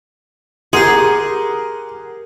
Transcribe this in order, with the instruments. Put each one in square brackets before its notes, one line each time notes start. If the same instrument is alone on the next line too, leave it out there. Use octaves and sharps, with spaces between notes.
[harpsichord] G4 C6 [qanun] G#4 [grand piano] A#4 F#5